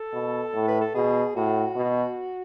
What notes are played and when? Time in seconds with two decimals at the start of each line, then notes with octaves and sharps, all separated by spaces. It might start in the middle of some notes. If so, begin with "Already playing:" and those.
Already playing: A4
0.14 B2
0.54 A2
0.68 B4
0.81 A4
0.95 B2 G#4
1.36 A2 F#4
1.76 B2